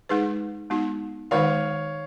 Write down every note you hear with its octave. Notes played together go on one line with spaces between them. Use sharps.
G#3 D#4 G#4 B4
G#3 B3 D#4 F#4
D#3 G#3 D#4 F#4 C#5 F5